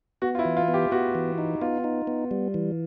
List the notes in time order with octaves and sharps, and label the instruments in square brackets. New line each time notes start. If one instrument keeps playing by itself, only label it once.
[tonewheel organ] B3 [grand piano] F#4
[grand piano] F4
E4
[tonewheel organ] E3
[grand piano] F4
[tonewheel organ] B3
[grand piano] G4
[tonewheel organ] B3 [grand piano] F#4
[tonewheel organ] E3
D#4
[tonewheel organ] B3 [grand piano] F4
[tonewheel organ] D#4
B3
G3
E3